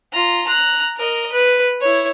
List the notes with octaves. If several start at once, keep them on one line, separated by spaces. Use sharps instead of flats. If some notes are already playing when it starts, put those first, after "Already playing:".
F4 A#5
A#5 F#6
A#4 D#5
B4
E4 C#5